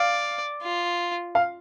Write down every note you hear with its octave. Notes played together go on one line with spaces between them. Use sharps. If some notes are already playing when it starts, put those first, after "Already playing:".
Already playing: D5 F5
F4
F5